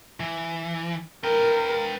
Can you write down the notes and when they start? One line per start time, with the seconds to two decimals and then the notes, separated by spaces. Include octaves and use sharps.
0.20 E3
1.24 A#4 B4 G5